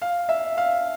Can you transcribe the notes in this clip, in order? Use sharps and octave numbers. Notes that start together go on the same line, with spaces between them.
F5
E5
F5